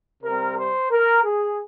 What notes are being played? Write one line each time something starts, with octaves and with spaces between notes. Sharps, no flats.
C3 G3 C4 A#4
C5
A#4
G#4